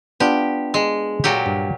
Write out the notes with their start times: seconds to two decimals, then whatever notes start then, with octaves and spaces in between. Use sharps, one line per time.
0.20 B3 D4 F4 G4
0.74 G#3
1.24 A#2 F#3 G4
1.46 G2